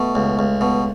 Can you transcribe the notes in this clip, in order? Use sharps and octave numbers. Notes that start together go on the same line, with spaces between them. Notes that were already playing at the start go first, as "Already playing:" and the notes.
Already playing: B2 A3
C#2
C#2
B2